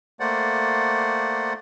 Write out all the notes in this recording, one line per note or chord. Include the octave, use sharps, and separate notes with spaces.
A3 A#3 C5 D5 F#5